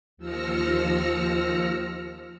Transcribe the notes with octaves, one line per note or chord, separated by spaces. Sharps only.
D#2 F3 E6 F6 A#6 C#7